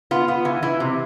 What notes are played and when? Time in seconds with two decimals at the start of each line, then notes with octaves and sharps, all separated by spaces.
0.11 B3 F4
0.28 B3
0.45 E3
0.63 E3 E4
0.80 C3